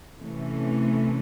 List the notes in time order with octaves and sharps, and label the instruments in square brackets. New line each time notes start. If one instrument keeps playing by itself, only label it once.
[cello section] C3 E3 A3 C#4